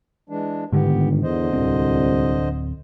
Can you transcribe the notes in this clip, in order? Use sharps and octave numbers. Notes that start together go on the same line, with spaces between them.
E3 G#3 D4
G1 G#2 D3 D#3 B3 G4
E2 D3 C5 D#5
D1 C2 C4